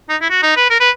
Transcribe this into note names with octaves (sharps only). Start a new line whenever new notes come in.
D#4
E4
F#4
D#4
B4
A#4
B4